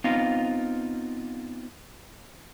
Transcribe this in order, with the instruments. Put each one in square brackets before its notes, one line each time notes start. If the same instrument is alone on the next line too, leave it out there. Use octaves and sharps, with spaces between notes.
[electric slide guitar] B3 C4 D#4 F4 F5